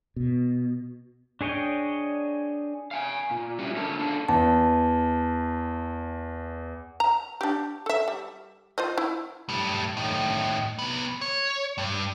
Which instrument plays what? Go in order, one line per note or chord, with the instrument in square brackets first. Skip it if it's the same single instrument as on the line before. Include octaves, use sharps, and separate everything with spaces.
[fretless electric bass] B2
[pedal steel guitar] D4 G#4 C#5 D#5 G5
[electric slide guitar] F5 G5 G#5
A#2
G3 C#4 E4 F#4 G4
D3 A#3 A#4 A5
D4 G#4 A4 F5 A5
[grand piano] E2 [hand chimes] A5
[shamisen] A#5
D4 G4
A4 E5
G3
F4 C5 D#5
E4
[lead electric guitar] A2 G3
A2 D#3
C3 B3
C#5
G2